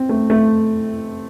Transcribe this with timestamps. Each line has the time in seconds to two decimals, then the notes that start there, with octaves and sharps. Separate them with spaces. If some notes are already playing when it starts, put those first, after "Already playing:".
Already playing: C4
0.09 A3
0.30 A3